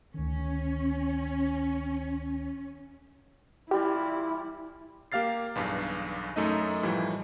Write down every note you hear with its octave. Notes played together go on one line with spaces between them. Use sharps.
D2 D#3 C#4
E3 G3 E4 F4 G4
A#3 G4 F5 F6 A6 C7
B1 E2 G2
F#2 A3 D#4 D#5
A2 E3 F3 G3